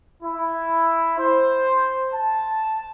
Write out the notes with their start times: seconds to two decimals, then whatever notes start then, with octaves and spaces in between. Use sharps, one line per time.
0.23 E4
1.18 C5
2.14 A5